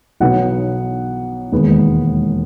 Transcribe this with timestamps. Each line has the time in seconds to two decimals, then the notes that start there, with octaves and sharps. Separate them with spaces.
0.20 B1 B2 F#3 B3 D#4 F#5
1.52 E1 D#2 D#3 G#3 B3